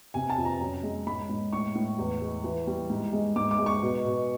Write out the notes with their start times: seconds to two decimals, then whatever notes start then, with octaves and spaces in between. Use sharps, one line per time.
0.14 C3 G#5
0.30 A5
0.38 F2
0.45 A#5
0.61 F#2
0.83 G#3
1.07 G#2 B5
1.29 G#2
1.53 A2 C#6
1.75 A2
1.99 E2
2.21 G#3
2.44 E3
2.67 G3
2.90 G#2
3.13 G#3
3.36 G#2 D6
3.51 D6
3.58 G#3
3.66 C#6
3.82 B2
4.04 B2